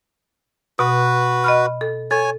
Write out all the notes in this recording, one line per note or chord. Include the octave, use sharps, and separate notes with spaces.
B2 F#4 B4
D#5 B5 F6
A4
A4 C#5 G#5